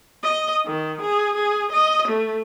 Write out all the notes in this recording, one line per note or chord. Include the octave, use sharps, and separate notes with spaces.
D#5
D#3
G#4
G#4
D#5
A3